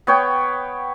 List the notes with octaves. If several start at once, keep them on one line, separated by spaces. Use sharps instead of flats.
B3 C#5 G5